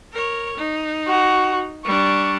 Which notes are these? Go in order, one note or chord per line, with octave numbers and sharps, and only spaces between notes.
A#4 C#5
D#4
F#4
G3 D4 C#6